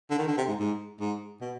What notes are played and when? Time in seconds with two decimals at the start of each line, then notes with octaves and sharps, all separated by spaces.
0.11 D3
0.18 D#3
0.28 D3
0.38 C3
0.49 G#2
0.60 G#2
1.01 G#2
1.41 B2